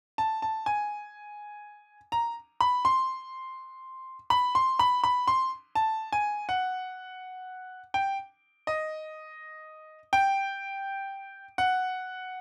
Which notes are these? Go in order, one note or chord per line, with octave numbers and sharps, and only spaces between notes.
A5
A5
G#5
A#5
B5
C6
B5
C6
B5
B5
C6
A5
G#5
F#5
G5
D#5
G5
F#5